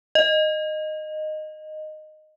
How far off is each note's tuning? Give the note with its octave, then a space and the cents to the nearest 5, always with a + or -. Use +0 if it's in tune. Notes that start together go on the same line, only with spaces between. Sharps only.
D#5 -10